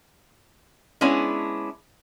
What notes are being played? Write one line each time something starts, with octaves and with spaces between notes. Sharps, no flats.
G#3 B3 C#4 D4 E4